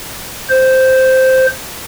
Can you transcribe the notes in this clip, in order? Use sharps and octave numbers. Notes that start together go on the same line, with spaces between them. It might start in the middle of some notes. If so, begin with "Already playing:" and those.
C5